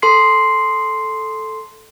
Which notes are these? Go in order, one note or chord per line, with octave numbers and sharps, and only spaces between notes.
A4 C6 C7